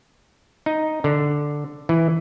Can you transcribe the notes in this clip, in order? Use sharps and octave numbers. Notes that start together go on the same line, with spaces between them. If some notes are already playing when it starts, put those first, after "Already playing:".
D#4
D3
E3